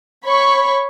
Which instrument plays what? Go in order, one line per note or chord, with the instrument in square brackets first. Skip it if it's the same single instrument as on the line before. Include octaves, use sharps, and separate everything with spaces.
[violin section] C#5 B5 C#6